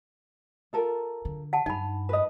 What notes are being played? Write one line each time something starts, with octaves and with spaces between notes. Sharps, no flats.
F4 A4 A#4
D3
F#5 A5
G2 D#4 G#5 B5
B4 D#5